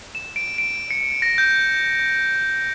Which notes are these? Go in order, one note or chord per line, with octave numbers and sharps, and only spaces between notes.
E7
D7
D7
C#7
A#6
G6